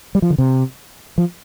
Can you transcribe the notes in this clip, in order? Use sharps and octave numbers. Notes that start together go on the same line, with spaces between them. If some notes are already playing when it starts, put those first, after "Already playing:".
G3
F3
D3
C3
F3